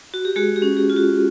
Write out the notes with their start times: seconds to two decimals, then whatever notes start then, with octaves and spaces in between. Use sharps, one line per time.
0.14 F#4
0.25 G4
0.36 G#3 F#4 G#4
0.56 G4
0.62 C#4
0.77 G4
0.90 F4
0.96 F#4